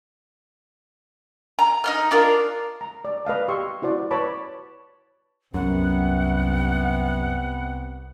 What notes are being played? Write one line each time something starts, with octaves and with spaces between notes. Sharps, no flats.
A#5
D#4 D#5 F6
D4 F4 A#4
A#5
D5
B4 D#5 F5 A5
G4 C6 C#6 E6
E4 F#4 C5 D5
B4 C#5 A5 B5 D6
C2 F#2 C3 B3 F#5